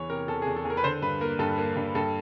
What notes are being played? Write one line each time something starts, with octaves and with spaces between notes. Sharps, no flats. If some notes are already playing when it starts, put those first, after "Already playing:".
Already playing: E2 E3 C#5
C3 A#4
E2 A4
G#4
E2
A4
E2
A#4
B4
D3 C5
G2 B4
A#3 A#4
G2 A4
A#3
G2
G2 A4